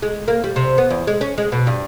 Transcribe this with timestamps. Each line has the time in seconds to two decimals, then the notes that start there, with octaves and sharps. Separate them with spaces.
0.02 G#3
0.28 A#3
0.44 G3
0.56 C3
0.78 B3
0.90 E2
1.07 G#3
1.21 C#4
1.38 G#3
1.52 B2
1.67 G2